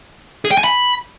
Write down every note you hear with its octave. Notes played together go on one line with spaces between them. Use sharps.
G#4
G5
G#5
B5